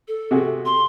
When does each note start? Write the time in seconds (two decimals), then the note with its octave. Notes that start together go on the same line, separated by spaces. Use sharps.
0.08 A4
0.31 C3 F#4 G#4
0.66 C6